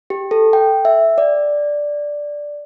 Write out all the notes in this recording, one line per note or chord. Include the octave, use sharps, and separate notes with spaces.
G4
A4
G5
E5
D5